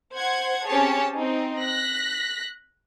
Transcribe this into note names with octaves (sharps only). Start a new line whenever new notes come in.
C5 F#5 G#6
C4 C#4 G4 G#4 C#5 A5
C4 D#4
F#6 A#6 B6